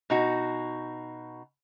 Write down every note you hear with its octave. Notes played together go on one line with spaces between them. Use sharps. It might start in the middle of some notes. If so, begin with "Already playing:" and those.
B2 D#4 F#4